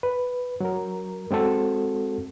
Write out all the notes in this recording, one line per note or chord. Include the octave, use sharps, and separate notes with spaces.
B4
F#3 A#4
G#3 C4 F#4 A4